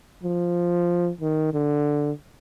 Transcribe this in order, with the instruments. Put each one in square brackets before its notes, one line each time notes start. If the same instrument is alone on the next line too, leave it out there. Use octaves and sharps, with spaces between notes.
[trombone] F3
D#3
D3